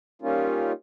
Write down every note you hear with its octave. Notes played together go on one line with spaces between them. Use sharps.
G3 A#3 C#4 D#4 F4